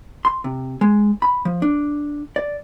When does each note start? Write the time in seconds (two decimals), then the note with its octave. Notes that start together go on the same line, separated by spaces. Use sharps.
0.25 C6
0.44 C3
0.81 G#3
1.22 B5
1.45 F3
1.62 D4
2.36 D5